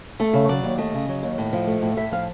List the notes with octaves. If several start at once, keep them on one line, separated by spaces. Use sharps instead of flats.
A3 A4
C#3
F#3 D5
D#2
A3 D#5
C#3
F#3
D#2
A2
F3
A3
A2
A2 E5
F3 F5